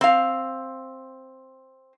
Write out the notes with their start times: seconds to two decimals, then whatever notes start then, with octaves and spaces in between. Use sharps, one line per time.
0.01 C4 F5